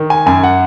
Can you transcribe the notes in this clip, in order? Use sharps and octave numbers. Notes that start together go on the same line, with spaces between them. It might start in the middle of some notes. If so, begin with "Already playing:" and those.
Already playing: D#3
G#5
F#2 G#5
F#5